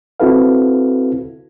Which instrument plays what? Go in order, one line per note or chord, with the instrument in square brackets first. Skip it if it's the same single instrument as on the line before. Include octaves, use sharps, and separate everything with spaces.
[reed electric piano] C4 E4 F#4 A4 B4 F5